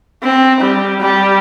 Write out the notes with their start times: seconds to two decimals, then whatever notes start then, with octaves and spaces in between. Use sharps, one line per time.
0.23 C4
0.60 G3
1.00 G3